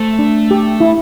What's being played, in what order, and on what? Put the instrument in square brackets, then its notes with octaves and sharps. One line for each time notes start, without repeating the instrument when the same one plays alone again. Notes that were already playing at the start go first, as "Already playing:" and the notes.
Already playing: [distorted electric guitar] A3 [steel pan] C5
[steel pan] D4
G4
E4